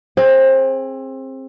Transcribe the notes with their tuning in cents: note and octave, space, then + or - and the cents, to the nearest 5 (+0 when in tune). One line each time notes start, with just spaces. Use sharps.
C4 +25 G#4 +0